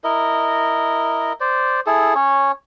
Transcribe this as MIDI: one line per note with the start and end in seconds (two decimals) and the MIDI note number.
0.04 1.33 64
0.04 1.33 70
0.04 1.33 75
1.40 1.80 72
1.40 1.80 74
1.87 2.14 64
1.87 2.14 68
1.87 2.14 69
2.15 2.52 61
2.15 2.52 73